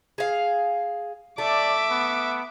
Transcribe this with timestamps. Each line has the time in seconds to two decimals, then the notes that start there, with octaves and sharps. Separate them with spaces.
0.18 G#4 F5
1.38 A3 D5 E5 D6
1.90 B3